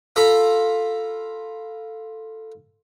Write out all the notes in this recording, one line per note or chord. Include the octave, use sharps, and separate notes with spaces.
F4 A4 A#5 B5 D6